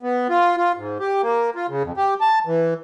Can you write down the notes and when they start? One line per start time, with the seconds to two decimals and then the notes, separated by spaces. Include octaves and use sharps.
0.03 B3
0.29 F4
0.57 F4
0.77 G#2
1.00 G4
1.22 A#3
1.56 F4
1.68 C#3
1.83 F2
1.97 G4
2.21 A5
2.47 E3